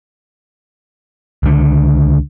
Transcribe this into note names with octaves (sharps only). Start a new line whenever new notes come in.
C#2 D3